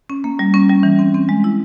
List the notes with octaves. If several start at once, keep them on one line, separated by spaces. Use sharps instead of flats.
C#4
A#3
G3
C#4
G3
E3
C4
C4
G#3
E4